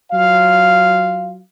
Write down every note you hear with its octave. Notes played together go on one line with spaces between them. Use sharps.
F#3 F4 F5